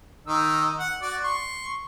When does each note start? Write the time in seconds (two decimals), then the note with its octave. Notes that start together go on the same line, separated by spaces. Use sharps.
0.27 D#3 D#4 E6
0.78 F#5
1.02 F#4 D5
1.23 C6 C#6